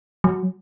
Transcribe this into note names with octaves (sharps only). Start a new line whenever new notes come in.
F#3